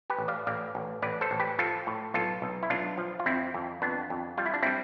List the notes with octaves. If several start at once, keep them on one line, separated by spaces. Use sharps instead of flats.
G4 B4
A1
D5 F5
A1 D5 F5
A1
A1 B4 D5
A4 C5
A1
G4 B4
F3 F4 A4
A2
B1 F4 A4
B1
E4
B1 D4 F4
F3
F4
F2 C4 E4
F2
F2 B3 D4
F2
G3 F4
E4
D4
G3 C4 E4